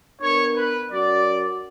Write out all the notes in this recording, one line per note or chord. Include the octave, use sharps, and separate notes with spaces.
B3 D4 A#4 C#5
B4
F#3 C#4 F#4 A#4 D5